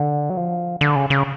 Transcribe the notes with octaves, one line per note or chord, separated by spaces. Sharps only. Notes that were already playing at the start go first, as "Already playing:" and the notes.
Already playing: D3
F#3
F3
D3
C#3
C#3